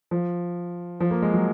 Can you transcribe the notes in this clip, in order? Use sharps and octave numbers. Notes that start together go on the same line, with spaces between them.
F3
F3
A#3
G#3
F#3